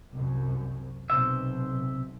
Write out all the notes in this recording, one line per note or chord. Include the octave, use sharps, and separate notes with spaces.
C2 F#2
B1 C3 C5 E5